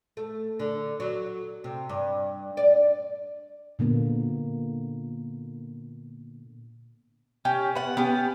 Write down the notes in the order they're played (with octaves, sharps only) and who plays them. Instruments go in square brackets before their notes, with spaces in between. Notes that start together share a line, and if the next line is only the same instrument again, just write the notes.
[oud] A3
D3
F#3
C3
G2
D5
[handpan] A#2 D3 A#3 B3
[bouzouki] C#4 G4
B3 F#5
B3 C#4 G4